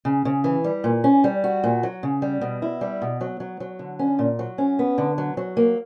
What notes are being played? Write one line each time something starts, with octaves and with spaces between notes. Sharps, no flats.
C#3
C#3
E3
G3
A#2
C#4
G3
F#4
A#2
F#3
C#3
G3
B2
E4
G3
B2
F#3
F#3
F#3
D3
C#4
A#2
F#3
C#4
B3
D3
F#3
F#3
A#3